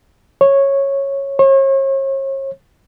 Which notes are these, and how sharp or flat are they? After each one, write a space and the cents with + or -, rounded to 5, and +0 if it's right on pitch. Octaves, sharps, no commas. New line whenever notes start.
C#5 -10
C#5 -40